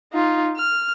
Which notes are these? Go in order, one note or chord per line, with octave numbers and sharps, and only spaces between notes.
D#4 F4
F6